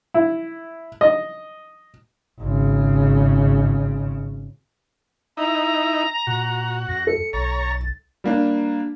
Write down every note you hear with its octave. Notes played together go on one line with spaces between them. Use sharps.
E4
D#5
G#1 C#3
D#4 E4 A#5
A#2 F#4
F2 A#6
A4 C#7
B1 C#5 A#5 A6
G3 A#3 D4